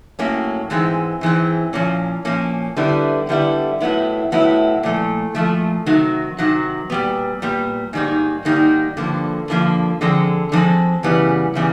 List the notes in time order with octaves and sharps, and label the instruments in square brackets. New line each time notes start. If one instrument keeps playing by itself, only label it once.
[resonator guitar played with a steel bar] A2 F#3 A#3 C#4
G#2 E3 G#3 C4
G#2 E3 G#3 C4
A#2 F3 A#3 C#4
A#2 F3 A#3 C#4
D3 G3 B3 E4
D3 G3 B3 E4
A2 F#3 B3 E4
A2 F#3 B3 E4
A#2 F3 A3
A#2 F3 A3
C3 D#3 F#3
C3 D#3 F#3
A#2 G3 B3
A#2 G3 B3
G#2 D#3 G3 A#3 D#4
G#2 D#3 G3 A#3 D#4
G2 D3 F3 A#3
G2 D3 F3 A#3
D3 F3 G#3 C4
D3 F3 G#3 C4
F#2 C#3 E3 G3 B3
C#3 E3 G3 B3